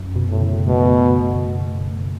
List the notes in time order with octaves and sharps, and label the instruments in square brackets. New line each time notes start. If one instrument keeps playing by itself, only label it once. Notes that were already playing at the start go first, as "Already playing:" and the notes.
Already playing: [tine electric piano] F#2
B2
[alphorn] A2
[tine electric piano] C#3
[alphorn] B2 [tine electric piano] A3